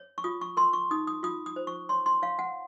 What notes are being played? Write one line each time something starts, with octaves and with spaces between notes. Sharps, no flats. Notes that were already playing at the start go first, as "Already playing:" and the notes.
Already playing: C#5
C#6
F4 D#6
C#6
A#4 C6
C#6
D#4 D#6
D#6
F4 D#6
D#6
C5
C#6
C#5 C6
C6
C#5 F5
F#5